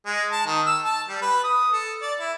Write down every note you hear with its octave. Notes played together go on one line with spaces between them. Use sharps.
G#3
A5
D#3
E6
A5
G3
B4
D#6
A4
D5
E4